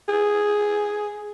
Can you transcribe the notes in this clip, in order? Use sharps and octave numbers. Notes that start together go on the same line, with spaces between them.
G#4